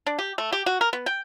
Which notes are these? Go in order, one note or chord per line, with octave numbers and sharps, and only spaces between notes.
D4
G4
A3
G4
F#4
A#4
B3
G5